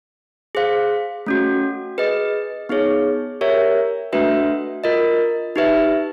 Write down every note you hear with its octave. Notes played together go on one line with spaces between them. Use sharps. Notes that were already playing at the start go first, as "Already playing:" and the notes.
G#4 C5 F5
A3 C#4 F#4
G#4 B4 D#5
B3 D#4 G#4 C#5
G4 A#4 C#5 E5
A3 D4 F#4 B4 E5
F4 A#4 D#5
D#4 G4 B4 E5